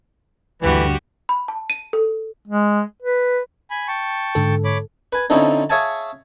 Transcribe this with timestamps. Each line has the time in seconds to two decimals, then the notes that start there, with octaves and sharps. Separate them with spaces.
0.63 D2 G2 D3 E3 F#4 G4 B4
1.29 B5
1.48 A5
1.70 D#7
1.93 A4
2.47 G#3
3.02 B4
3.70 G#5 B5
3.88 G5 A5 C#6
4.35 G#2 D3 A4
4.64 C#5 B5 D6
5.13 B4 G#5
5.30 D3 F3 C4 C#4 D#4 E4
5.70 G#4 C#5 E5 F5 G#5 A5